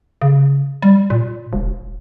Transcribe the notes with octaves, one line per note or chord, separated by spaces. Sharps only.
C#3
G3
A#2
E1